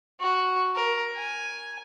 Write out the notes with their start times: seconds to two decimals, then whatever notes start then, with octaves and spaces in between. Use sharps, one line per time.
0.20 F#4
0.75 A#4
1.16 G#5